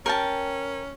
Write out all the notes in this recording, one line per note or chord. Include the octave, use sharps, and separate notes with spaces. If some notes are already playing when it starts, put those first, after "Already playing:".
C#4 A#4 G5 A5